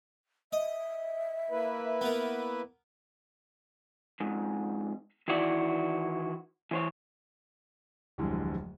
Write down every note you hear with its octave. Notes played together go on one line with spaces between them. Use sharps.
D#5 E5
A#3 E4 B4
B3 A#4
F2 G#2
D#3 E3 E4 F#4 D5
E3 C5 C#5
D1 F2 D3 E3 G3 G#3